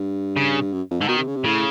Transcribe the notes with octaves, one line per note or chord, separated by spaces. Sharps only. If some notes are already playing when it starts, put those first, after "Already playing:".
Already playing: G2
C#3
F#2
F2
G#2 D3
B2 D#3
C3
C#3
C3
A2 C#3